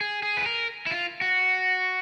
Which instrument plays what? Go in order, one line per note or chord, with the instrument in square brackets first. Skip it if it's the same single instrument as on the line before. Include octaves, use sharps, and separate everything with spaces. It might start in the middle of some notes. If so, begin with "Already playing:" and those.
[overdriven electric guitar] G#4
G#4
B4
A#4
E4
F4
F#4